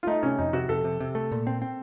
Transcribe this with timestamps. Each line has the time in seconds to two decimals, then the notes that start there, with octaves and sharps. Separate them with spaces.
0.03 F4
0.07 A3 D#4
0.23 C3 C#4
0.38 F2 D#4
0.53 C3 F#4
0.69 F2 A4
0.84 C3
1.00 C3
1.15 A3
1.32 A#2
1.47 C4
1.62 C4